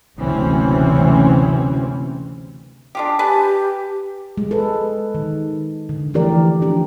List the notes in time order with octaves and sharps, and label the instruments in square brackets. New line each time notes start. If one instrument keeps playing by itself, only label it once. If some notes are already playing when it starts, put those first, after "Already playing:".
[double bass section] F#1 D2 C3 E3 C4 C#4
[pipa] D4 F4 G4
[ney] G4 [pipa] B4 G#5 A5
[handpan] G#3
A4 B4
D#3
D3
E3 F3 A3 G4 A#4 D5
F3 D4 G4